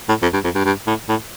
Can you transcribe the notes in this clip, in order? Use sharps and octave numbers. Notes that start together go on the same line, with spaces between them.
A2
F2
G2
F2
G2
G2
A2
A2